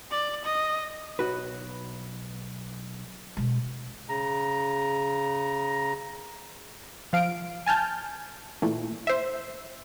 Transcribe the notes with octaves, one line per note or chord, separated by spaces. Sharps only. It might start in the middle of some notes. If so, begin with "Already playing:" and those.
D5
D#5
B1 F#4 B4
B2 G#3
C#3 A#5
F3 F5 D7
G#5 A5 F6 G6
A#2 E3 A3
C5 E5